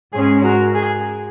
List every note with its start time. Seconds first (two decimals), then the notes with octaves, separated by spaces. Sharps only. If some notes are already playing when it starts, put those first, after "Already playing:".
0.12 G#2 G#3 C#4 G#4
0.44 F#4 A#4
0.75 G#4